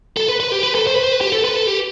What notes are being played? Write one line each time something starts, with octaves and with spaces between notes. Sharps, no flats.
A4
B4
B4
G4
B4
A4
C5
B4
C5
B4
G4
A4
B4
A4
G4